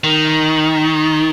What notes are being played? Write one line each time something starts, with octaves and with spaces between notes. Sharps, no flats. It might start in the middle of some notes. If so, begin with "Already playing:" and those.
D#3